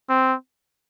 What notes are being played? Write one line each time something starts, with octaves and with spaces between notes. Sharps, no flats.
C4